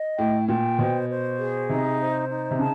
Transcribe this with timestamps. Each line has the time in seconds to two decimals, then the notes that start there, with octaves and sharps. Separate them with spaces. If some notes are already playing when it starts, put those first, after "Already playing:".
Already playing: D#5
0.18 A2 G5
0.48 A#2 G5
0.78 B2 C5
1.09 C5
1.39 G#4
1.69 C3 D#4
1.99 C5
2.30 D#4
2.51 C3
2.59 C#3 A5